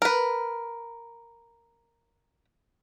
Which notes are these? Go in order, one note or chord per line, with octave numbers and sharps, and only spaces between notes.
A#4 B4